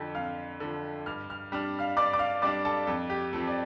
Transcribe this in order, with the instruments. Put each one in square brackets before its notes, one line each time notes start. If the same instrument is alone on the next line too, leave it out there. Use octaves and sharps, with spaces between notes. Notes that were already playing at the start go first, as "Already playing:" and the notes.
Already playing: [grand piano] F2 D3 F3
F2 F5 F6
D3 F3
G2 F6
F6
G3 D4 F6
F5 F6
G2 D5 D6
D6
F5 F6
G3 D4 D5 D6
A4 A5
F2 A4
G4
F3 C4 A4
D5